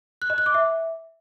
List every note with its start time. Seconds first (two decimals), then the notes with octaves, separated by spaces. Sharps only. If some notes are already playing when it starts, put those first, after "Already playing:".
0.22 F#6
0.30 D#5
0.38 F#6
0.46 D6
0.54 E5